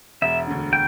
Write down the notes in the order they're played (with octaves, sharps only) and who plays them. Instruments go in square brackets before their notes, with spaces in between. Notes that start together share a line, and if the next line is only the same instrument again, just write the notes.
[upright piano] E1 [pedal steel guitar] E5
[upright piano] D2 D3
[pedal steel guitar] G5